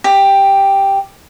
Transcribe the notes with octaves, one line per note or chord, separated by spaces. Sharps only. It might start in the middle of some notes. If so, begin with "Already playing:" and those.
G4